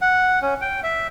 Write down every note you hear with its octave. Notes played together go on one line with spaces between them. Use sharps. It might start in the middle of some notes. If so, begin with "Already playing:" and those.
F#5
C#4
G5
E5